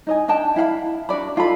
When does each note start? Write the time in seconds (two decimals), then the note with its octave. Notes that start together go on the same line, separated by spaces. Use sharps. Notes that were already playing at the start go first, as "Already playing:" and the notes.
0.07 D#4 D#5 G#5
0.28 D4 D#5 G5 A5
0.56 E4 F5 F#5 B5
1.09 D4 F#4 D5 B5
1.36 D#4 F4 A4 B5